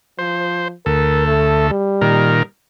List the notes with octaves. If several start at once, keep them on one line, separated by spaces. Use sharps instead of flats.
F3 C5
D2 A4 A#4
A3
G3
A#2 D#3 A#4